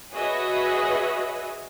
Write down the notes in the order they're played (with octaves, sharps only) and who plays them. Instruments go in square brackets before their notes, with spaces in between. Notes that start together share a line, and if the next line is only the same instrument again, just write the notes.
[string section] F#4 G#4 B4 C#5 D#5 E5